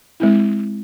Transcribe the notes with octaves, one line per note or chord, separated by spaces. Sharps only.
G#3 C4 E4